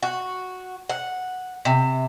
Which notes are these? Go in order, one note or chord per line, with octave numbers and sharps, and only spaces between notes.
F#4
F#5
C3